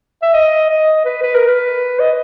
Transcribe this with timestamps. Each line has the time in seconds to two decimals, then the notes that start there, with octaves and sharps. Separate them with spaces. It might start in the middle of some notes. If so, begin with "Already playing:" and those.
0.22 E5
0.33 D#5
0.70 D#5
1.05 B4
1.23 B4
1.35 A#4
1.48 B4
2.00 D#5